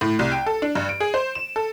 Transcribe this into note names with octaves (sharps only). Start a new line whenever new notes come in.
A2
C2
G5
A4
D4
G2
D7
G#4
C5
E7
A4